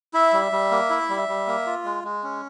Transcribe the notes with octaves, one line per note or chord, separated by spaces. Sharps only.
E4 E5
G3
G3
A#3
E4
G3
G3
A#3
F4
G#3
G#3
C#4